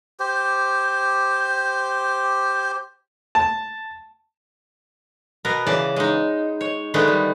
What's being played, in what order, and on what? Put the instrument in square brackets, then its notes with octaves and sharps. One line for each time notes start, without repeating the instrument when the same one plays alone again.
[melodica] G4 C5
[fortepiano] A5
[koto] B2 B3 A#4
C#3 E3 D5 A5
G#3 D#4
C#5
D3 D#3 G#3 A3 B3
G3